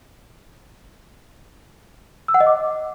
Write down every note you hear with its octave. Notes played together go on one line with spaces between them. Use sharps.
E6
F#5
D#5
D6